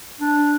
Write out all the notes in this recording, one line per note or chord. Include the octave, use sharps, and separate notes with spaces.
D4